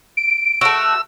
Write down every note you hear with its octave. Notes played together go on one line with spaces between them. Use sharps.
D7
A3 F#4 E6